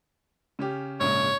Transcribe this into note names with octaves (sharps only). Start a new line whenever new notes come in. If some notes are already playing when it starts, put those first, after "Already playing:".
C#3 C#4 G4
A#1 G#2 C#3 C#5